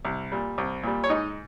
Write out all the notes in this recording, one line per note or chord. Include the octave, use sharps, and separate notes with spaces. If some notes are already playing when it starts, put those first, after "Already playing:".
C2
A#2 G3
C2
A#2 G3
C#5
G#2 D#4 D#5